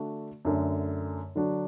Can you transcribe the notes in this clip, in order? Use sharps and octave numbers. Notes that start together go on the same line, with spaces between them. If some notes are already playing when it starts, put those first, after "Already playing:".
Already playing: D3 A3 D4 F#4
F#2 D3 A3
D3 F#3 D4 F#4